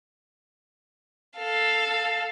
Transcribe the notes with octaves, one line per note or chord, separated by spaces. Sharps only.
A4 F5